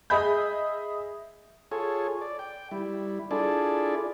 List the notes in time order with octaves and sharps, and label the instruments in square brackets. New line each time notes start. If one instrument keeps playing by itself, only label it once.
[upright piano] G#4 D#5 E5 B5 G6
[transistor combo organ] F4 G#4 A4 C#5
D5
G5
G3 E4
D4 E4 F4 G#4 A4 D5